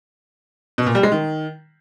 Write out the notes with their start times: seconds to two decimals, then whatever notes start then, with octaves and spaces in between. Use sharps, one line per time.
0.78 B2
0.86 A#2
0.95 G3
1.03 G#3
1.12 D#3